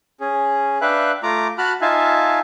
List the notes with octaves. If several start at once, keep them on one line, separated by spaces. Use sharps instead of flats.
C#4 G#4
D4 B4 E5 F5 G5 F#6
A3 F4 A#5 D6
F#4 A5 B5 F6 F#6
D#4 F4 E5 F5 G#5 A5